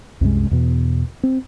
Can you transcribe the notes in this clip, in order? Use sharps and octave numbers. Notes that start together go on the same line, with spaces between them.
C2 F#2 C3 G#3
E2 B2
C4